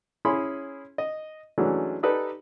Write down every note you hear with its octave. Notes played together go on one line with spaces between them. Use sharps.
C#4 E4 G#4 B5 C6
D#5
E3 F#3 G#3 A3 C#4 D4
D#4 G4 A4 B4 D5 D#5